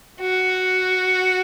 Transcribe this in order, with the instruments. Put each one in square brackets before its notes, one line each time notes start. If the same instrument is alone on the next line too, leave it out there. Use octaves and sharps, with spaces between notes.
[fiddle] F#4